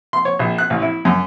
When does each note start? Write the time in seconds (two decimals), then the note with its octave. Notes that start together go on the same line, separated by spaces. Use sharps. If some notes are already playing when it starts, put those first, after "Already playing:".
0.13 C6
0.25 C#5
0.39 A#1
0.58 F#6
0.70 A1
0.82 E4
1.05 F#2